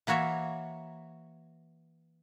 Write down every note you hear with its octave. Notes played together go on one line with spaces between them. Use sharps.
E3 A#3 F#4 C#5 E5